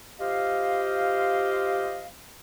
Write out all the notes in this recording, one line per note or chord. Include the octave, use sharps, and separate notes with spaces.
F4 G4 C5 D#5 F5